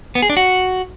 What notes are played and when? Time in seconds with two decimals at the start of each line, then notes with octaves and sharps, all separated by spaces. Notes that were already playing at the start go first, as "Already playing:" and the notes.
0.15 B3
0.22 G#4
0.30 D4
0.37 F#4